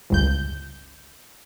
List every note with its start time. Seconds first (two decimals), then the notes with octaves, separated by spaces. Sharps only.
0.10 G1 C#2 G6